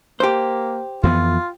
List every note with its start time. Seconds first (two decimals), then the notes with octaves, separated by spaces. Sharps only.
0.20 A#3 G4 C5
1.03 F2 E3 B3 F4